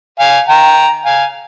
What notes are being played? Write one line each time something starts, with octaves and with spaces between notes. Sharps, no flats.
F5 G#5
G5 A#5
F5 G#5